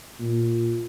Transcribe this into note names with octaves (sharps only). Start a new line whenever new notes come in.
A#2